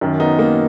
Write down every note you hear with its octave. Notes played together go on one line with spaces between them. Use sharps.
F#2 D#3
B3 D#4
A#3